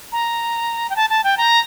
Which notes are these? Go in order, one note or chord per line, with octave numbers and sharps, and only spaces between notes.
A#5
G5
A5
A5
G5
A#5